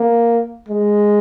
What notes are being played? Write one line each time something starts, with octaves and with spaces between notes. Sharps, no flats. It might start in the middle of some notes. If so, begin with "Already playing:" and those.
Already playing: A#3
G#3